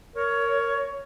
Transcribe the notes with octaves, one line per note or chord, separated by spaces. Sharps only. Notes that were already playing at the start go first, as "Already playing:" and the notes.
A#4 C#5